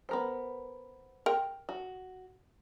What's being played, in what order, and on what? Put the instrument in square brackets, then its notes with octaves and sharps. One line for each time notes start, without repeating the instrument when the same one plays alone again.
[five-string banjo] B3 A#4 C5
[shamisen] A#4 G5
[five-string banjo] F#4